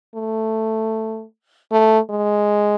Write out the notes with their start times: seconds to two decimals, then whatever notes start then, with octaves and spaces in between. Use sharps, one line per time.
0.15 A3
1.72 A3
2.10 G#3